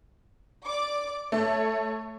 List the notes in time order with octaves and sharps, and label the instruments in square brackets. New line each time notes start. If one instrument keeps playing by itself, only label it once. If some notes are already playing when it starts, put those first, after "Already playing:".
[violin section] D5 D6
[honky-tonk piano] A3 [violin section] C#5